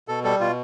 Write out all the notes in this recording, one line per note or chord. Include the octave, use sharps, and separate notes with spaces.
B2 A4
G3 A4
B2 F4